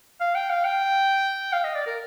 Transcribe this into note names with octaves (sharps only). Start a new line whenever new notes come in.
F5
G5
F5
G5
F5
D#5
D5
A#4